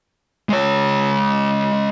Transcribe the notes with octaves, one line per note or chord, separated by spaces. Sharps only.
G#3 C#5